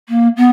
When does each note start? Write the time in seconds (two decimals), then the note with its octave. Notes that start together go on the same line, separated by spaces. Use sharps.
0.08 A#3
0.36 B3